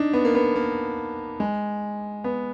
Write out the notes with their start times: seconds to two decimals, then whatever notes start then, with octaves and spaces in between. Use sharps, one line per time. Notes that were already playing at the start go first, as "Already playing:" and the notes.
Already playing: D4 D#4
0.13 B3
0.25 A#3
0.35 B3
0.56 A#3
1.40 G#3
2.24 B3